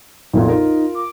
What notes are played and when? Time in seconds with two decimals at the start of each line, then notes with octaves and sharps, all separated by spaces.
0.33 B1 F2 A#2 E4
0.48 D#4 F4 A#4
0.95 D6